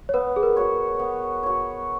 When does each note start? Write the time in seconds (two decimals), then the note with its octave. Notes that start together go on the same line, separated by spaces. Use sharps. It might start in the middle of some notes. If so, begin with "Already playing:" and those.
0.09 C#5
0.14 B3 B4
0.36 G#4
0.43 A#4
0.56 F#4 C#5
0.99 B3
1.43 F#4 C#5